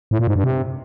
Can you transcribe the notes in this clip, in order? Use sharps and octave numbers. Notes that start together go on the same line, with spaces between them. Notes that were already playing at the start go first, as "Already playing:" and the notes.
A2
A#2
G#2
G2
C3